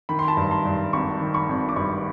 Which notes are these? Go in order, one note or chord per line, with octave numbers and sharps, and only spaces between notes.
D#3 B5
C6
A5 B5
G2
A#5 C6
G2
G#1 B5 C#6
D#3
B5 C#6
G#1
D6
G2 B5 C#6